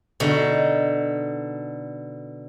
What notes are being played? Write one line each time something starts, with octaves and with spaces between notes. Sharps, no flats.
B2 D3 D#4